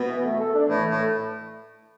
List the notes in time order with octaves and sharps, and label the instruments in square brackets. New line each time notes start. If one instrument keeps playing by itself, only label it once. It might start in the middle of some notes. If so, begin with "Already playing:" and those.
Already playing: [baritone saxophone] B2 [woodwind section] B3
[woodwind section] E3
A3
A4
D4
[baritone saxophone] A2 [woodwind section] E3
[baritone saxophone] A2 [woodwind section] A3